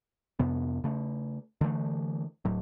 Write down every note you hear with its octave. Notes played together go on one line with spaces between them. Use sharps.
F2 C3 B3
C#3 A3
D3 E3 G3 A3
D1 A2 F#3